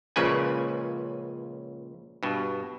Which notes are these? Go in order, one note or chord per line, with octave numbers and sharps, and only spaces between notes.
C#2 A#2 C#3 F3 B4 G#5
G2 B2